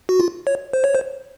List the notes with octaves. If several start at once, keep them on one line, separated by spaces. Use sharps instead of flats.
F#4
F4
C#5
C5
C#5
C5